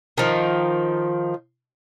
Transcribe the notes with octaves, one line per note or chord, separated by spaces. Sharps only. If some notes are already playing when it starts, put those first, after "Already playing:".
D#3 F3